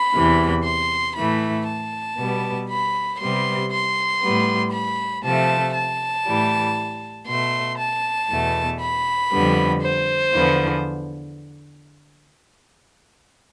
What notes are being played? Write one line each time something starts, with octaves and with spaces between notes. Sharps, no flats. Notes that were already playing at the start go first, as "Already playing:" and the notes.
Already playing: B5
E2 C3 E3
C6
A2 E3 A3 B5
A5
B2 G3 B3
B5
C3 G3 B3 C6
C6
A2 G3 B3
B5
C3 F3 A3 A5
A5
A2 E3 G3
B2 A3 C6
A5
E2 B2 A3
B5
F2 D3 G3 B3
C5
E2 D3 F3 B3